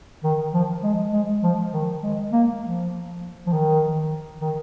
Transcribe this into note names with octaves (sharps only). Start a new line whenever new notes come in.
D#3
F3
G#3
G#3
F3
D#3
G#3
A#3
F3
F3
D#3
D#3